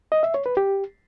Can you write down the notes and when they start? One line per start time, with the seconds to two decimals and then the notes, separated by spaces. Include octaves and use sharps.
0.12 D#5
0.23 E5
0.34 C#5
0.46 B4
0.57 G4